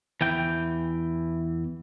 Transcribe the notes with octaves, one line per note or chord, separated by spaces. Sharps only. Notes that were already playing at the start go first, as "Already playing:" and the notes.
E2 E3 G5